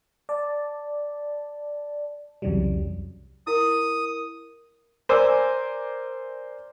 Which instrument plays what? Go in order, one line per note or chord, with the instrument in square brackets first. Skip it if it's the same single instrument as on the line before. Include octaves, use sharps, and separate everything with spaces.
[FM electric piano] D5 A5
C2 F2 C#3 E3 F#3 G3
[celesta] E4 A#4 [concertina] D#6
[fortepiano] A#4 C5 D5 G#5 D6 E6